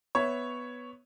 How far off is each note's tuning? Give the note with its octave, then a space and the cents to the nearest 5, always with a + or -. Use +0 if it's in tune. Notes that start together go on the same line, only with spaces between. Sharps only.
B3 +0 C#5 +0 E5 +0